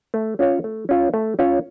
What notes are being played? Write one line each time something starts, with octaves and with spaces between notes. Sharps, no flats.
A3
C#4 F4 C#5
A3
C#4 F4 C#5
A3
C#4 F4 C#5